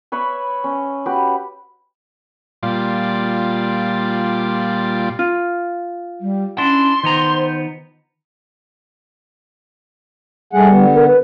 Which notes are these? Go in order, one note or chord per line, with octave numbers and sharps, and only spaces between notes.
B4 C#5 E5 B5
C#4
F#4 G4 B4
A#2 G3 F4 D5
F4
G3
C#4 D4 E4 C6
D#3 B3 C5 A#5
G3 A3 G#4 F#5
D3 B3
A#4
B4